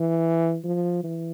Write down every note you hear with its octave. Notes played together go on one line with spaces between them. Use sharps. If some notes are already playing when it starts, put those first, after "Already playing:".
Already playing: E3
F3
E3